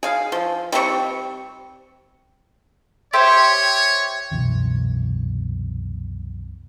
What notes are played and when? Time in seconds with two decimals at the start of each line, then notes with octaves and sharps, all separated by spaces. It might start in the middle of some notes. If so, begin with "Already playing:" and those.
0.03 G#4 F5
0.32 F3
0.72 G3 C4 A#4 C#6
3.13 G4 C5 C#5 E5
4.31 C2 F#2 B2 E3